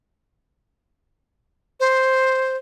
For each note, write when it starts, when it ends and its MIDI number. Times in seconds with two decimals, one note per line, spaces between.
1.80 2.56 72